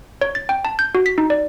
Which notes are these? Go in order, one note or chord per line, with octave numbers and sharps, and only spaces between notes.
C#5
A6
G5
A5
G6
F#4
B6
D#4
D5